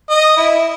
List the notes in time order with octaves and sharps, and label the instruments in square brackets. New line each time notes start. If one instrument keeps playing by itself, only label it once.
[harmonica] D#5
E4